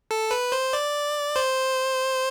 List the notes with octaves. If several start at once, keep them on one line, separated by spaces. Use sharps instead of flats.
A4
B4
C5
D5
C5